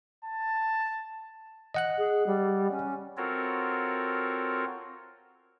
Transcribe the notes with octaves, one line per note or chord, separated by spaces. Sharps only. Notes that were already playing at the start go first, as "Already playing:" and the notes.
A5
D#5 F#5 F#6
G#4
G3
C#4
C4 F4 F#4 A4 A#4 C#5